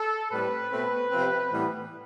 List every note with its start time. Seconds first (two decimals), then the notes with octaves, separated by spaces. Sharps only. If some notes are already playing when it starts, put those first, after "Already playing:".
Already playing: A4
0.30 A2 G3 C4 B4
0.70 B2 A3 C4
1.10 C3 F3 C4
1.50 A2 E3 G3 B3